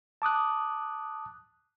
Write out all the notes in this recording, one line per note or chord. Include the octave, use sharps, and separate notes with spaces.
A5 D6 D#6 F#6